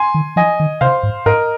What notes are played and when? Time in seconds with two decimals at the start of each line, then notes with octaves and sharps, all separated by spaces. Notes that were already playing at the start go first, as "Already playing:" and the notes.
Already playing: G#5 C6
0.14 D#3
0.36 F3 D#5 G#5
0.60 D#3
0.81 C3 C5 F5
1.03 G#2
1.26 G#2 A#4 D#5